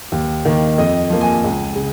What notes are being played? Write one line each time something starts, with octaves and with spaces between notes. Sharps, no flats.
D#2
D#3 A#3
F2 D#5
F3 A#3
G#5
C#2
C#3